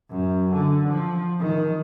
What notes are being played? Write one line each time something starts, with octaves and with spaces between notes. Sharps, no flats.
F#2
D3
F3
D#3